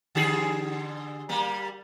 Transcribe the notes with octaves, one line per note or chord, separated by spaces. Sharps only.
D3 G4 G#4
G3 A#3